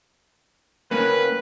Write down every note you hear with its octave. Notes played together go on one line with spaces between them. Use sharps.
A#3 C#4 B4